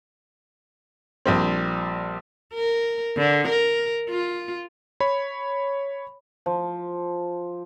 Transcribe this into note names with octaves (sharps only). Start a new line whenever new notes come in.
A#1 G3 C4
A#4
D3
A#4
F4
C#5 B5
F3